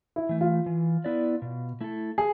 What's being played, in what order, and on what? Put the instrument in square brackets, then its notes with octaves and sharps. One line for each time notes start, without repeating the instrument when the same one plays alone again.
[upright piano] E4
[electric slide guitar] E3 A3
[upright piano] F4
[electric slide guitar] E3
B3 E4 B4 D5
B2
A3 E4 A4
[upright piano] G#4